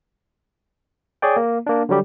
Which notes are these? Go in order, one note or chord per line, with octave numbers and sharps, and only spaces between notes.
G#4 C#5 D5 G5
A#3
A#3 D4
D3 F#3 G3 G4